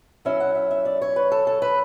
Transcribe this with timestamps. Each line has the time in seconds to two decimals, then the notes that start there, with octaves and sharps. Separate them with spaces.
0.25 F#3 C#4 E4 E5
0.40 F#5
0.55 E5
0.71 E5
0.85 D5
1.02 C#5
1.16 B4
1.32 A4
1.47 A4
1.62 B4